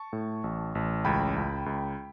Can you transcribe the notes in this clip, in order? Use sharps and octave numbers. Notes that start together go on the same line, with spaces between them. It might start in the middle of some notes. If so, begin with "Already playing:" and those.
Already playing: A5 C#6
A2
A1
A1
C#2 G5 B5
C#2
C#2